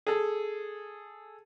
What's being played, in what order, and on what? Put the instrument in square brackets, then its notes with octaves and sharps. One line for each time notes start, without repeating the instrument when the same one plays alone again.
[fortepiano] G#4 A4